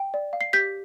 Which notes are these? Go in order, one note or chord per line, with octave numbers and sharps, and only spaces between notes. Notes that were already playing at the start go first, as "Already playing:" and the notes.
Already playing: G5
D5
F5
C7
G4 G6 B6